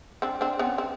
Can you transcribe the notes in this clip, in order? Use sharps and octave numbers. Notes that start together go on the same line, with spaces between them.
C4 D4
C4 D4
B3 C#4
C4